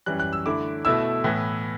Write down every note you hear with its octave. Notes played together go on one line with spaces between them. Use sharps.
F#2 E3 G3 F#6
F#6
E6
D3 A3 E4 D6
B2 A3 E4 E6
A2 E3 B3